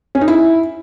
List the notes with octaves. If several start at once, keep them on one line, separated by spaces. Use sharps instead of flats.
C#4
D#4
E4